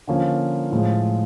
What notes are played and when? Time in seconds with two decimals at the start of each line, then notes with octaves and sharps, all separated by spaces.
0.08 D3 F3 A#3 C#4 F4
0.72 A2 F3 G#3